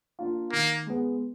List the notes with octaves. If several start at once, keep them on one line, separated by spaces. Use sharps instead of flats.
A#3 D4 F4
D#3 A#3
G#3 B3